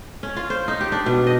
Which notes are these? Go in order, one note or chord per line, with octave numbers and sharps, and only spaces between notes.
C#4
F4
C5
D#4
G4
D4
B2
D#5